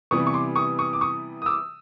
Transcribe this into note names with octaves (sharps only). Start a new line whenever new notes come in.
C3 E3 G3 B3 C#6 D#6
C#6
C6 D6
C#6 D#6
C#6 D#6
D6
C#6 D#6
D#6
D6 E6